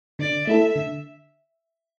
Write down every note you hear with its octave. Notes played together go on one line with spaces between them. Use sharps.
D3 D5
A3 E4 A4 E5
D3